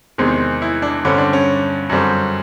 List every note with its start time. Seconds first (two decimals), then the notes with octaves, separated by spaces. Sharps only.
0.18 E2 C3 D#3 G#3 C4
0.62 E4
0.82 D4
1.05 G2 D3 G3 C4 C#4
1.18 D4
1.33 C#4
1.89 F#2 D3 G3 C4